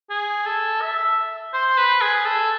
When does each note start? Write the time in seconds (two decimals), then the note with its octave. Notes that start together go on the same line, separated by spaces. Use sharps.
0.10 G#4
0.46 A4
0.81 E5
1.53 C5
1.78 B4
2.01 G#4
2.25 A4